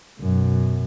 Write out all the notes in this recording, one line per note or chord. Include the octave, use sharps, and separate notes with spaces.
F#2 B2